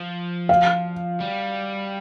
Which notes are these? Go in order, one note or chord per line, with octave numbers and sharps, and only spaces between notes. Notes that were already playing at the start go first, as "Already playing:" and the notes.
Already playing: F3
F5
G3